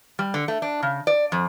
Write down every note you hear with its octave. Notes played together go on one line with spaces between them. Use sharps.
G3
D3
A3
D4
C#3
D5
F2